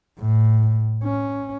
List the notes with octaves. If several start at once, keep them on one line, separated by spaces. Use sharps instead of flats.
A2
C#4